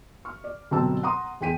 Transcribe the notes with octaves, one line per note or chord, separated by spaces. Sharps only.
C#6 F6
D5
G1 B2 F#3 C4 A5 E6
F#5 A#5 C6 D#6
E2 G#4 G5 B6 D#7